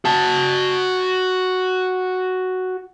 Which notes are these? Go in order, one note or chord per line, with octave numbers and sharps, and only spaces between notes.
F#4 A5